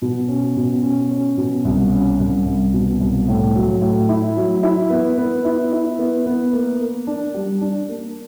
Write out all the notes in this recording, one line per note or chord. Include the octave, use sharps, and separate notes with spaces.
B2
C#4
B2
C#4
C#4
B2
C2
C#4
C2
C2
B2
C2
A2
F#3
A2
E4
F#3
E4
B3
B3
E4
E4
B3
B3
A#3
A#3
D4
G3
D4
A#3